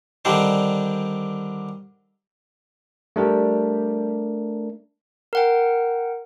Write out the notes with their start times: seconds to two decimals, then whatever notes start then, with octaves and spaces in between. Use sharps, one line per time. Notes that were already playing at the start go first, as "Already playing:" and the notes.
0.25 D3 D#3 G3 C4 D4 C5
3.16 G3 A3 D4 G4 A#4
5.33 A#4 F#5 G5